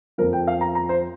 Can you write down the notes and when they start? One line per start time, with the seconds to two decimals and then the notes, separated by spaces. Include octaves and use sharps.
0.18 F2 F3 A#4
0.33 G5
0.47 F5
0.61 A#5
0.75 A#5
0.89 C5